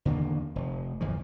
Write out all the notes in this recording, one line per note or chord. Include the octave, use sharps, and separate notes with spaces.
E2 D3 D#3 A#3
F1
G1 E2 A#2 F3